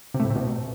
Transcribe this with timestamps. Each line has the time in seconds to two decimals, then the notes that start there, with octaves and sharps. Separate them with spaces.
0.14 C3
0.20 A3
0.25 A2
0.30 C3
0.36 B2